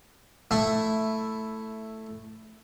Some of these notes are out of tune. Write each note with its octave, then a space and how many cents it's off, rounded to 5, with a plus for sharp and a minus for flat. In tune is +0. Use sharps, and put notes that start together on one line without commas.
A3 +5 E4 +0